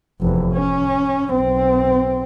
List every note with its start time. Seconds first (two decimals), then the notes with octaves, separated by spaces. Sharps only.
0.21 F1 E2
0.53 C#4
1.32 B1 C4